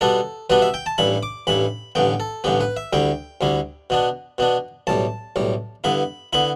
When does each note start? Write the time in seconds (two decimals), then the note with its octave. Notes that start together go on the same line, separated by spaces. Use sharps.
0.01 B2 G3 B3 D4 A4
0.50 B2 G3 B3 D4 B4
0.62 E5
0.74 G5
0.86 A5
0.98 A1 G2 G3 E4 B5
1.23 D6
1.47 A1 G2 G3 E4 B5
1.95 A1 G2 D3 B3 G5
2.20 A4
2.44 A1 G2 D3 B3 G4
2.61 B4
2.77 E5
2.93 D2 D3 G3 E4 G5
3.41 D2 D3 G3 E4
3.90 B2 B3 D4
4.38 B2 B3 D4
4.87 B1 A2 G3 A5
5.36 B1 A2 G3
5.84 G2 D3 B3 E4 B5
6.33 D3 B3 E4 B5